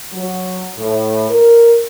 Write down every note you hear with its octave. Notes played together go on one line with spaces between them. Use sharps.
F#3
A2
A#4